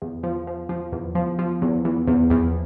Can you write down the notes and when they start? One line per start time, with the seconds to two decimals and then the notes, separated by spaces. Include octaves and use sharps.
0.02 E2
0.23 F3
0.47 F3
0.69 F3
0.92 E2
1.15 F3
1.39 F3
1.62 E2
1.85 E2
2.07 E2
2.30 E2